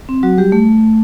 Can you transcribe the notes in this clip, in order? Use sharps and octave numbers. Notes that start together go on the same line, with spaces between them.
C4
F#3 F#4
G3 G4
A3